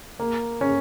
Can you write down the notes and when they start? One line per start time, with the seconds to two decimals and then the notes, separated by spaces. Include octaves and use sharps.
0.20 A#3
0.61 C#4